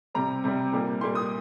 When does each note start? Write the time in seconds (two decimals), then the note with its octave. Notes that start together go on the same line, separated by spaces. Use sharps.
0.15 C3 G3 C4 A#5
0.44 C3 G3 C4
0.72 A#2 G3 A#3
1.01 A#2 G3 A#3 C6
1.15 D#6